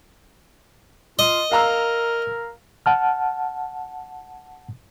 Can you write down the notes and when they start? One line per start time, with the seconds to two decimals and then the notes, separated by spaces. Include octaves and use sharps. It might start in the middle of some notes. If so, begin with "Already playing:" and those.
1.19 F4 D#5
1.52 A#4 F5 A#5 E6
2.86 F#5 A5 F6